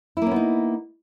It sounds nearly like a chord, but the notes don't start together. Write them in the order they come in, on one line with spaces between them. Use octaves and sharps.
E4 A#3 C#4 B3 D#4